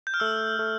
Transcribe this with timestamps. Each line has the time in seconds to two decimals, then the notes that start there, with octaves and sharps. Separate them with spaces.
0.07 G6
0.14 F6
0.20 A3 E6
0.59 A3